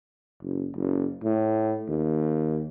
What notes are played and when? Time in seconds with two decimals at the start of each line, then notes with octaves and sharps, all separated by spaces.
0.43 F#1
0.76 F#1
1.24 A2
1.88 D#2